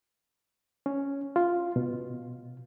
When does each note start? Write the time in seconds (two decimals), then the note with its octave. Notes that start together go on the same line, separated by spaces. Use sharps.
0.86 C#4
1.36 F4
1.76 B2